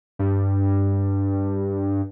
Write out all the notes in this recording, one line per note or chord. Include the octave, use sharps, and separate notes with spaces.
G2